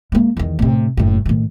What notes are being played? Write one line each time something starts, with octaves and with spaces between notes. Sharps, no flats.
G#3 A#3
E2 D#3
A2 C3
F#1 A2
A2 D#3